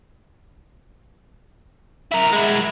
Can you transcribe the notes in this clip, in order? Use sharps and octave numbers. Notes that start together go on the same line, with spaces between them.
E4 A#4
G#3 E4